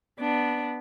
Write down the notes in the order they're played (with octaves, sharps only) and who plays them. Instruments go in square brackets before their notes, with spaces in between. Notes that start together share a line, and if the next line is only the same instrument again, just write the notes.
[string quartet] B3 D4